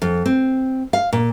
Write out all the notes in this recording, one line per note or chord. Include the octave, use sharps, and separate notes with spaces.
F2
C4
F5
A#2